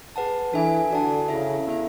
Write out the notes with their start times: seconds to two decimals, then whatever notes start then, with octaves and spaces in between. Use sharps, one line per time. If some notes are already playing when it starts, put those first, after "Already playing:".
0.16 G#4 B4 F#5 A5
0.53 E3 D4 A4 E5 G#5
0.90 D3 F#4 A4 D5 F#5 A5
1.28 C#3 E4 A4 E5
1.67 B3 E4 A4 E5